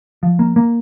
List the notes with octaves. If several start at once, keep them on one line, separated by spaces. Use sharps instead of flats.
F3
A#3
A#3